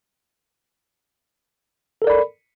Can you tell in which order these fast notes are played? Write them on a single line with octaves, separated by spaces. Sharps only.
A4 A#4 D5 B5